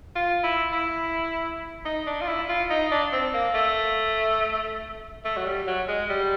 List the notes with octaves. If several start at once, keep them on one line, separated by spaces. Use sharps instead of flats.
F4
E4
E4
D#4
D4
F4
E4
F4
D#4
D4
C4
A#3
A3
A3
F#3
G3
F#3
G#3
G3